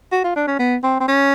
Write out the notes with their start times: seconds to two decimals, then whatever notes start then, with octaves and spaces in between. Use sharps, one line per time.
0.12 F#4
0.24 F4
0.36 D4
0.47 C#4
0.59 B3
0.84 C4
1.00 C4
1.08 C#4